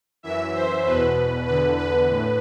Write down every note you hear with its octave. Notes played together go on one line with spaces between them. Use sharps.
F#2 E3 E5
C5
E2 B2 B4
E2 D3 B4
B4
A2